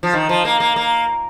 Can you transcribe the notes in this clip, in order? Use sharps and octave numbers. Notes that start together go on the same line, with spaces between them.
F3
D#3
F3
A#3
A#3
A#3